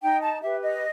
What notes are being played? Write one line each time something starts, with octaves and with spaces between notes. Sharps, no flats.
D#4 G5
A5
G4 B4 E5
D#5